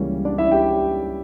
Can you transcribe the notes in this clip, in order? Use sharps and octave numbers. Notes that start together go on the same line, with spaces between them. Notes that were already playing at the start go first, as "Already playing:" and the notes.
Already playing: C#2 C#3 E3 G3 A#3 C#4
D4 D5
E4 E5
G4 G5